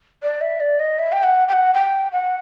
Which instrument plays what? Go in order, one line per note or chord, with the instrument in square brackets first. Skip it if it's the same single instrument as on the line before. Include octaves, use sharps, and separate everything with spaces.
[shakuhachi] D5
E5
D5
D#5
E5
G5
F#5
G5
F#5
G5
F#5